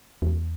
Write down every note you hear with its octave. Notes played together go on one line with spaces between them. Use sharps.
E2